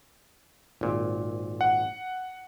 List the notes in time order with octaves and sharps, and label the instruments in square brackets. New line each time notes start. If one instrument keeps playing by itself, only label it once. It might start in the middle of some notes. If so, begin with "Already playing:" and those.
[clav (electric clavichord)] G#1 A#2
[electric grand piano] F#5